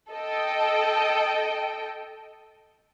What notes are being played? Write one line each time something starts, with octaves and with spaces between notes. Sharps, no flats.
A4 D#5 G5